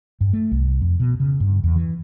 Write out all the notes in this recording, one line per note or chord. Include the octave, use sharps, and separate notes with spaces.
G2
A3
C2
F2
B2
C#3
G2
E2
E3